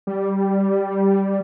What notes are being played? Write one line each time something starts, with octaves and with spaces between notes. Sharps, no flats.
G3